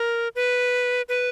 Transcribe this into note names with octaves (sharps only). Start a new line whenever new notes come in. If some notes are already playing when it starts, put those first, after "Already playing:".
Already playing: A#4
B4
B4